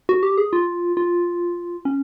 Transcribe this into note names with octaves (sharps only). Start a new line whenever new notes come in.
F#4
G4
G#4
F4
F4
C#4